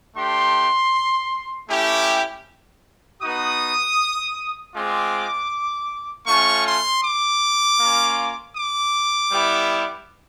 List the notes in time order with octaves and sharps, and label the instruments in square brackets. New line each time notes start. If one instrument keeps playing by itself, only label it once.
[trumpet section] A3 D4 G4 C6
A3 C#4 E4 G4
B3 D#4 F#4 D#6
G#3 C4 F4 D6
A3 C#4 F4 C#6
C6
D6
A#3 C#4 F4
D6
G3 B3 E4 G4